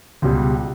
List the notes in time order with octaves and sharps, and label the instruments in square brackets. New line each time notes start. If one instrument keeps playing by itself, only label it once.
[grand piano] C#2 B2 G3